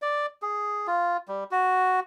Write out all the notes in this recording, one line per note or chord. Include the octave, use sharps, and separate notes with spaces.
D5
G#4
F4
G3
F#4